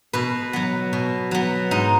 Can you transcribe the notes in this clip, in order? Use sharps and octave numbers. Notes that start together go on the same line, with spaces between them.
B2 B4
F#3 B3
B2
F#3 B3
G#2 D#4